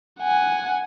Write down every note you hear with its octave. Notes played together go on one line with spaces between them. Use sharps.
F#5 G#5